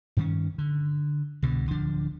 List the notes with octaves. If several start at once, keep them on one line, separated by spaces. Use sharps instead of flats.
G2 D#3 C#4
D3
C2 G2 B2 D3
D1 D3 F3 D4